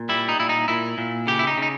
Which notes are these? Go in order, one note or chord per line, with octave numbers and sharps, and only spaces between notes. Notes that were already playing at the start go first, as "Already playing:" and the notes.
Already playing: A#2
G3 E4
D#4
A#2 E4
D#4
A#2 E4
A#2
C#3 G4
E4
D#4
C#3
D#4